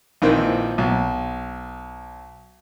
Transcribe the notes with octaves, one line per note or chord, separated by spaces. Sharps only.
A#1 D#3 E3 C4
B1